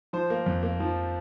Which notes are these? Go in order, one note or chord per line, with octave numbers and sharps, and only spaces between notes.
F3 C5
A#3
F2
A#3
F3